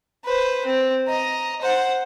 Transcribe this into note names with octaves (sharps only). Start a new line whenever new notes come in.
B4 C5
C4
D#5 A#5
C5 F#5